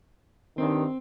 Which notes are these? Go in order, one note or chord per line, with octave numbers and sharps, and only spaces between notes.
G2 D#3 C4